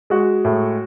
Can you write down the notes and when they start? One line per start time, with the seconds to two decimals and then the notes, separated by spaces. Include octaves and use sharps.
0.10 G#3 F#4
0.45 A2